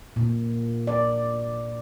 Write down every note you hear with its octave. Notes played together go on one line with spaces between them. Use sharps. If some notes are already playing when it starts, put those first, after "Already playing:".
A#2
D5